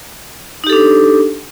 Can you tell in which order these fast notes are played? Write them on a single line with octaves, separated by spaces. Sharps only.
D#4 G4 A4 D4